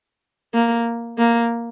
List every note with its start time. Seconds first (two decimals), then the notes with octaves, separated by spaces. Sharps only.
0.54 A#3
1.18 A#3